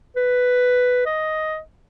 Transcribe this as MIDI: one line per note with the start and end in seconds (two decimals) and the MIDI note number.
0.16 1.02 71
1.06 1.59 75